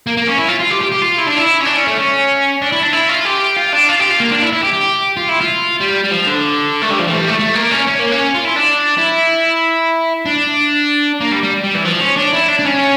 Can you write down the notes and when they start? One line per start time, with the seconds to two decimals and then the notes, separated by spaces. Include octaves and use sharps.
0.07 A#3
0.17 A#3
0.28 C#4
0.38 E4
0.48 F4
0.60 F4
0.70 G4
0.81 G4
0.92 G4
1.02 F4
1.18 E4
1.27 D4
1.37 E4
1.60 C#4
1.66 D4
1.76 C#4
1.87 A3
1.97 C#4
2.62 D4
2.72 E4
2.83 D4
2.93 E4
3.09 F4
3.25 G4
3.56 F4
3.73 D4
3.89 F4
4.00 G4
4.10 F4
4.20 A#3
4.31 D4
4.42 E4
4.53 E4
4.63 G4
4.73 G4
5.17 F4
5.29 E4
5.41 F4
5.80 G3
6.04 G3
6.11 F3
6.27 D3
6.82 A3
6.90 G3
6.99 F3
7.07 E3
7.13 A3
7.18 G3
7.28 A3
7.39 A3
7.55 A#3
7.71 C#4
7.87 C#4
8.00 A#3
8.12 C#4
8.34 F4
8.45 E4
8.56 D4
8.98 E4
10.26 D4
11.21 A#3
11.32 G3
11.43 G3
11.64 G3
11.74 E3
11.84 F3
12.00 C#4
12.16 D4
12.33 E4
12.48 D4
12.59 D4
12.65 C#4